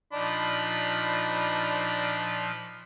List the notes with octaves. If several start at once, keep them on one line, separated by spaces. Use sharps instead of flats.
A#2 F3 D4 D#4 B5